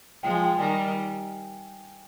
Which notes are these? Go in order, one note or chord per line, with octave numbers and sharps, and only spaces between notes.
F3 G#3 G5
G#5
G5
D#3 G3 G#5